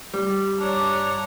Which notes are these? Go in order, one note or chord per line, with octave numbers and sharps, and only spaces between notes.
G3
G2 D4 C#5 A#5